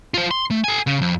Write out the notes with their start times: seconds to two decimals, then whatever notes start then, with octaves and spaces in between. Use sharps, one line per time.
0.14 F4 C5
0.31 C6
0.50 A3
0.64 A4 G#5
0.87 C#3
1.01 F2